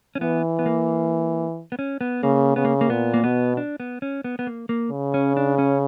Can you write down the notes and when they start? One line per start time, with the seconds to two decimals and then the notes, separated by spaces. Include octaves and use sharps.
0.15 C#4
0.21 E3 B3
0.59 B3
0.66 A#3
1.72 B3
1.79 C#4
2.01 B3
2.23 C#3 A#3
2.56 C#3 B3
2.65 A#3
2.81 A#3
2.90 A#2 B3
3.14 A#3
3.24 B2 B3
3.57 D4
3.80 B3
4.02 C#4
4.24 B3
4.39 B3
4.47 A#3
4.69 A#3
4.91 C#3
5.14 C#4
5.37 D4
5.59 C#4